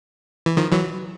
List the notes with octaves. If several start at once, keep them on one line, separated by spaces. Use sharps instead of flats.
E3
D#3 F3
E3 F#3